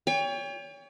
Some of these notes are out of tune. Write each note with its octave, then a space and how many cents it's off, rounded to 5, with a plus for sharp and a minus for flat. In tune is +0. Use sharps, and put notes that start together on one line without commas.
C#5 +35 G5 +40